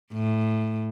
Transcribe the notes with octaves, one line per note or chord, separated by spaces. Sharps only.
A2